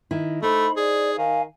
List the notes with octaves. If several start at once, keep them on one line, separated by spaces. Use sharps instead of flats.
D#3 E4
A3 D#4 C5 B5
G#4 D5
D#3 F5 G#5